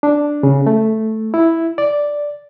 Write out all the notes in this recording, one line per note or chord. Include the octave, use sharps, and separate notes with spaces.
D4
C#3
A3
E4
D5